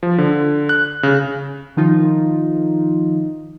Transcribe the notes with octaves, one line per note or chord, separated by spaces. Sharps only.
F3
D3
F#6
C#3
D#3 F3 D#4 F4